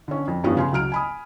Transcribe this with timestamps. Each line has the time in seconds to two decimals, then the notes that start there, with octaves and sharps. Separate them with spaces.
0.08 D3 C#4
0.28 F2
0.44 G2 E3 F3 B3 C#4
0.57 C#3 G#5 C6
0.72 C#2 F#3 F6 D7
0.92 G#5 B5 D#6